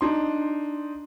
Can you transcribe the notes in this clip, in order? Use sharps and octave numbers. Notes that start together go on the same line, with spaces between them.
D4 D#4 C6